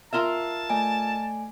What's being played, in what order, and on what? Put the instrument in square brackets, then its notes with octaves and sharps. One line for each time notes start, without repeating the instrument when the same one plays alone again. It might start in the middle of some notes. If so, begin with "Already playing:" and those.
[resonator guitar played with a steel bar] F4 A#4 E5 [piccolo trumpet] A5
[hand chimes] A3 D5 G#5